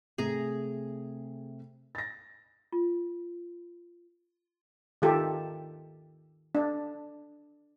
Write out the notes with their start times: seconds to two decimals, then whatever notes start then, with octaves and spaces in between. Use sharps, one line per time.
0.18 C3 A3 G#4 A#5
1.95 A6 A#6
2.73 F4
5.02 D#3 F4 G4 A4
6.55 D4